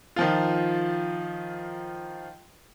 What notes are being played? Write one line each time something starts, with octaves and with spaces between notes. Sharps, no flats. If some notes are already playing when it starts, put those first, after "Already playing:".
D#3 F3 F4